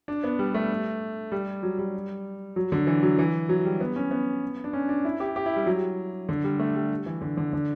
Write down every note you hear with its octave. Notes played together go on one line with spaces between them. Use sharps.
D4
B3
G3
A3
G3
F#3
G3
F#3
D3
E3
F#3
E3
F#3
G3
B3
C#4
B3
D4
C#4
D4
E4
G4
G4
E4
G3
F#3
D3
G3
A3
G3
E3
D3
D3
D3